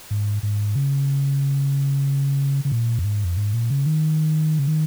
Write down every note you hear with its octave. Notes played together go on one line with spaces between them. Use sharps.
G#2
G#2
C#3
C#3
A#2
F2
G#2
F2
G#2
A#2
C#3
D#3
C#3
D#3